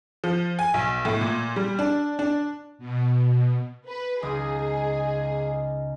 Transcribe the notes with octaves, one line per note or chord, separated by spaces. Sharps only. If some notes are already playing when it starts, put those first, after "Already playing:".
F3
G#5
B1
A2
A#2
G3
D4
D4
B2
B4
C#2 D#4 G#4 D#5